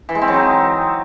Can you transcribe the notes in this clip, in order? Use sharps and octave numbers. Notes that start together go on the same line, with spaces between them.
E3
G#3
C4
F#3
D#4